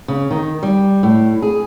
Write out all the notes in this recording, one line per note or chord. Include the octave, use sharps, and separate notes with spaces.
C#3
D#3
G3
A2
G#4